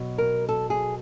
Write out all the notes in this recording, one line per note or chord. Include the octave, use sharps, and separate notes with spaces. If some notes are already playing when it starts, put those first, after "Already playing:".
Already playing: B2 F#3
A#4
A4
G#4